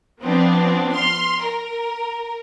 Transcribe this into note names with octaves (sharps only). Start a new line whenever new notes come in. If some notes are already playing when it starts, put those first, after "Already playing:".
F3 B3 C4 D4
C6 F6
A#4